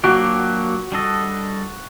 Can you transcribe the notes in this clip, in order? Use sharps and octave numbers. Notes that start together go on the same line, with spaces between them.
F#3 A#3 D4 F#4 G4
G3 D4 A4 D#5